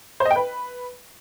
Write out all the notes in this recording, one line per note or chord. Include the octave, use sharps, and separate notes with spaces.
C5
D#5
G5
B4